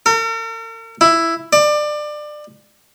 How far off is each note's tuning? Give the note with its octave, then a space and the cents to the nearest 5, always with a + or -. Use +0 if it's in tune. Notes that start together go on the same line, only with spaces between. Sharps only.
A#4 -45
E4 +5
D5 +25